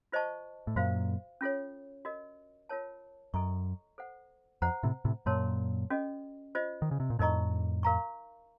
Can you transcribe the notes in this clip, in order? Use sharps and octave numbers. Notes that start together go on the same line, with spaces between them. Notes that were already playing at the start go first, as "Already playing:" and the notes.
F4 C5 D#5 A5 C#6
A2
F#2 A#2 F#4 C5 F5
C#4 F4 A4 C#5
F#4 A#4 D#5
F4 A#4 C#5 A5
F#2 A4 D#5 A#5 C#6
A4 C5 F#5
F2 C5 F#5 A#5
A2 C3
A2 C3
F#2 A#2 A#4 C#5 A5 C6
C#4 F#4 A4 D#5
F4 C5 D#5
D#3
C#3
C3
A#2
F2 A2 D#4 A#4 D#5 A#5 C#6
A#4 F5 A#5 C#6